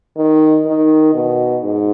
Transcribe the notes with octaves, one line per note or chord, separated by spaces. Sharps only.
D#3
D#3
B2
G#2